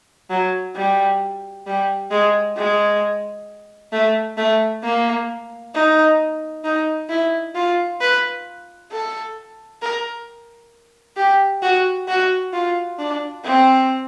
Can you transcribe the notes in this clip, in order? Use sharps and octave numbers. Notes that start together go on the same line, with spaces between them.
F#3
G3
G3
G#3
G#3
A3
A3
A#3
D#4
D#4
E4
F4
B4
A4
A#4
G4
F#4
F#4
F4
D4
C4